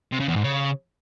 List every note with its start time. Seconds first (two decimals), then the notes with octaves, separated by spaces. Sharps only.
0.12 C3
0.20 C#3
0.28 E2
0.36 G#2
0.44 C#3